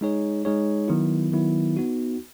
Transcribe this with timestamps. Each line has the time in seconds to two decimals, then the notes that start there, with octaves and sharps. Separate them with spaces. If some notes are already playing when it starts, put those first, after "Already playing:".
0.01 G#3 D#4 G#4 C#5
0.45 G#3 D#4 G#4 C#5
0.88 D#3 F#3 B3 E4
1.32 D#3 F#3 B3 E4
1.77 B3 D#4 F#4